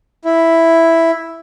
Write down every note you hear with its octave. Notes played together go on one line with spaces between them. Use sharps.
E4